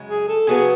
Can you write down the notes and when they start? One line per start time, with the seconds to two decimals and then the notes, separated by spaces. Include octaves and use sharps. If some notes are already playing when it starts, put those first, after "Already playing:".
Already playing: F#2 C#3 G#3
0.10 G#4
0.28 A4
0.47 C#3 F#3 B3 G#4